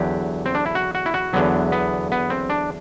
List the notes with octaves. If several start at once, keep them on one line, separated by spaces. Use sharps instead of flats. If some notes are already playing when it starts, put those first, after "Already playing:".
Already playing: E2 D3 F#3 G4
C4
D4
E4
F#4
F#4
E4
F#4
E2 D3 F#3 B3
B3
B3
C4
D4